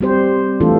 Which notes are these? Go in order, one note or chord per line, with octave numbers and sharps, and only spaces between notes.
G3 C4 G4 C5
E3 A3 D4 F4 A4